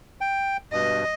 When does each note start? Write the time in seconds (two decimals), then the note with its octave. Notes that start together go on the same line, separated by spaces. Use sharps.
0.21 G5
0.73 G2 B2 D#5